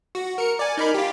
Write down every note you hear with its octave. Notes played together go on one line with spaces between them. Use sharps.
F#4
A#4 C#7
D5 G#5
D#4 A#4 B5
F4 G4